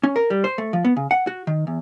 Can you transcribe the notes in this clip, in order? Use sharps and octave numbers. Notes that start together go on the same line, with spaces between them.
C#4
A#4
G3
C5
A3
F3
B3
C#3
F#5
F#4
D#3
E2